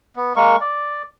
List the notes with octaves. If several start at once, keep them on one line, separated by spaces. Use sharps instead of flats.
B3
G#3 A#3 A#4 C#6
D5